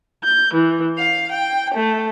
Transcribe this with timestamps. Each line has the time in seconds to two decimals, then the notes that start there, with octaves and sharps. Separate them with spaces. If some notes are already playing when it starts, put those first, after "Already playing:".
0.24 G6
0.54 E3
0.98 F5
1.30 G5
1.74 A3